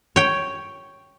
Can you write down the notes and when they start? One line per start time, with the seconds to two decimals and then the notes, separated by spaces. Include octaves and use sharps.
0.16 C#5 G5